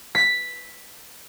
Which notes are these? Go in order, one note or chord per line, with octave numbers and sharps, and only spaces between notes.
B6